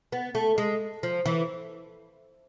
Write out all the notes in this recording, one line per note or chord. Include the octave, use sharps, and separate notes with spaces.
B3
A3
G#3
F3
E3